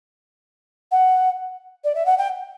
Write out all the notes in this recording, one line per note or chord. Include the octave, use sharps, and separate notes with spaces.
F#5
D5
E5
F#5
G5